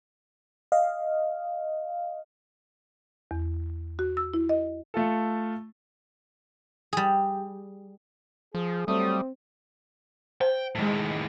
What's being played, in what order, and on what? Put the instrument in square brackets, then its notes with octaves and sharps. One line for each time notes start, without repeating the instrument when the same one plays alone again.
[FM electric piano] D#5 F5
[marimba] E2
F#4
E6
E4
D#5
[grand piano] A3 F4 A4
[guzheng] G3 G#4
[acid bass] F3 [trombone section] G#4
[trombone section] F#3 A3 [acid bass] G3 [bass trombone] C4 [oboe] D#6
[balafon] C5 [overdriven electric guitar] G5
[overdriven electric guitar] A2 D#3 [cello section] G#3